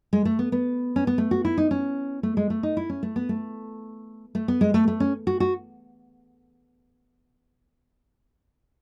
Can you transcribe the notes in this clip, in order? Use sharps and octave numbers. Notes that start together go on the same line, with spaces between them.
G#3
A3
B3
B3
C#4
B3
A3
F#4
E4
D#4
C#4
A3
G#3
A3
D#4
E4
C#4
A3
B3
A3
A3
B3
G#3
A3
A3
C#4
F#4
F#4